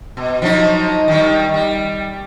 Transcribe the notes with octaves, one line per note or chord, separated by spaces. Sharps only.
B2
F3 F#3 D#4
D#3 G3
G3